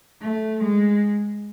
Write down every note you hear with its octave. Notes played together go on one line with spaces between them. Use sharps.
A3
G#3